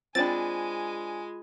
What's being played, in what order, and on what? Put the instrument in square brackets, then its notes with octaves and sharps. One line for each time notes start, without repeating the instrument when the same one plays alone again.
[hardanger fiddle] G#3 G#5 [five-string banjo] C4 D4 [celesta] F4 B5 [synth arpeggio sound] A6